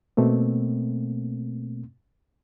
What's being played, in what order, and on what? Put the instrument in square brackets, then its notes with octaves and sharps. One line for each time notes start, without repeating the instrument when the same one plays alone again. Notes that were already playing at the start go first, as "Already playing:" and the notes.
[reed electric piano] B2 A3 A#3 C4